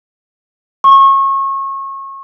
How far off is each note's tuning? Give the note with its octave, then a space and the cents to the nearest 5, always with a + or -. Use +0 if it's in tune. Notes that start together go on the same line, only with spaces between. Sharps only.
C#6 -30